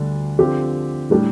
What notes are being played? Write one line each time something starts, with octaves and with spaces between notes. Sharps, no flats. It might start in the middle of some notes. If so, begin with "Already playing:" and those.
Already playing: D2 D3 G3 D4
D3 F3 C4 G4
A2 G3 D4 G4